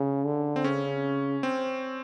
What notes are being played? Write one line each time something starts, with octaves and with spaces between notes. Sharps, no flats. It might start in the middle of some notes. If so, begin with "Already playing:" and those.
Already playing: C#3
D3
C4
C#3 C#4
C4